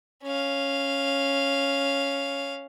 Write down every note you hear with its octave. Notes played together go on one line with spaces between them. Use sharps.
C#4 F5